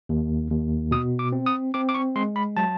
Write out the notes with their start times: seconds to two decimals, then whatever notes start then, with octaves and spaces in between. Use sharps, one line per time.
0.09 D#2
0.51 D#2
0.91 B2 D#6
1.19 D6
1.32 C4
1.46 D#6
1.74 C4 D6
1.89 D6
1.94 C#6
2.16 G#3 C6
2.36 B5
2.57 F#3 A5